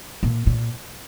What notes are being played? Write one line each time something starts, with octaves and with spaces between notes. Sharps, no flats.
A#2
A#2